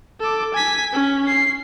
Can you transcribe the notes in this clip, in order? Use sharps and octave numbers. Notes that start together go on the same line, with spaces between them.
A4 D6
G#5 B6
C#4
C7